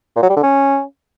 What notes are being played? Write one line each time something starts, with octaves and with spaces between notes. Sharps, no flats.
A#2
F#3
G3
D3
C#4